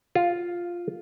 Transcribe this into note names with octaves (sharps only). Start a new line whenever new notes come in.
F4